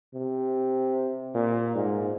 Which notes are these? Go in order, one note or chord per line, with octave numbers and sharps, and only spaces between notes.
C3
A#2
G#2